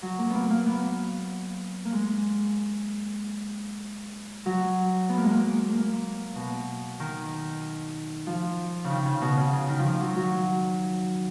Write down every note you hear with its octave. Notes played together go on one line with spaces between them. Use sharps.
F#3
A#3
A#3 B3
A#3
B3
A#3
G#3
F#3
B3
A#3
G#3
A#3
A#3
B2
D#3
F3
C#3
D#3
C#3
B2
C#3
C#3
D#3
F3
D#3
F#3
F#3